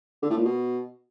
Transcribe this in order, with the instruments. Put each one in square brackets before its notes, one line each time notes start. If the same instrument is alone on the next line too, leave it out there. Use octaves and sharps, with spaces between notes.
[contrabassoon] D3
A2
A#2
B2